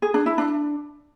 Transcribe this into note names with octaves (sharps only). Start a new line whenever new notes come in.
G#4
D4
E4
D4